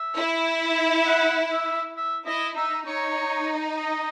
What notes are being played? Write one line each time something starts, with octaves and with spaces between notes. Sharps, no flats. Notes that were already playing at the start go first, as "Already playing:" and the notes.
Already playing: E5
E4
F#5
E5
E5
E4 D#5
D#4 E5
D#4 C#5
D#5